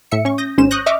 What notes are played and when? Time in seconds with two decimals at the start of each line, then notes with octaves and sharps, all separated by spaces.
0.11 A2 E5 C#7
0.25 C#4 C#6
0.38 D#6 G6 A#6
0.58 G#1 C#4 C5 E7
0.71 C#6 D#6 F#6 G6 A#6
0.86 D#5 E5 C#6 D6 F6